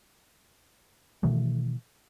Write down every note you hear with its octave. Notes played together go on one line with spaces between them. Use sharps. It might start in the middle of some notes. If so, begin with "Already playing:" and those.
B2 D#3 E3 A3